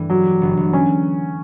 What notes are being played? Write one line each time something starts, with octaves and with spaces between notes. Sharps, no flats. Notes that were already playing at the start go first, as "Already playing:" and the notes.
Already playing: G2 E3 G3 A3
F#3 G4
G4
G1
G1
F#3 C#4